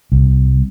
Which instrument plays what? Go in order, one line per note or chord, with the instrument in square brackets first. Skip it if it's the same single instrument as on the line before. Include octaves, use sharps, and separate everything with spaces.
[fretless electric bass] C2